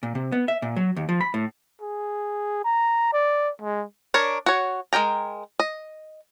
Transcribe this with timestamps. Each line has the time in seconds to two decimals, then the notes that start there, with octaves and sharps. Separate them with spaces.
0.03 A#2
0.15 C3
0.32 B3
0.48 E5
0.62 A#2
0.76 F#3
0.96 D#2
1.09 F3
1.21 B5
1.34 A2
1.81 G#4
2.64 A#5
3.13 D5
3.61 G#3
4.14 D4 A#4 C#5
4.46 F#4 C#5
4.93 G#3 A#4 G5 A#5
5.59 D#5